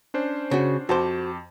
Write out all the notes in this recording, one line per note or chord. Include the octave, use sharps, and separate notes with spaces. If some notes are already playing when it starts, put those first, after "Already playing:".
C#4 D4 C5
C#3 F#4
F2 F#4 C5 A5 D6